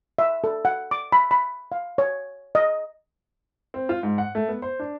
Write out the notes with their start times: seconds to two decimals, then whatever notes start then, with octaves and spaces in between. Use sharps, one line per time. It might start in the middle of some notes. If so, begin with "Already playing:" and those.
0.19 E5
0.44 A4
0.65 F#5
0.91 D6
1.12 B5
1.31 B5
1.72 F5
1.98 C#5
2.55 D#5
3.74 C4
3.89 F4
4.03 G#2
4.18 F#5
4.35 A3
4.49 B3
4.62 C5
4.79 D4